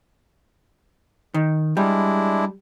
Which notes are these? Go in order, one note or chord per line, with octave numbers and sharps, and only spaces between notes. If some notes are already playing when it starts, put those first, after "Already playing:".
D#3
G3 G#3 D4 E4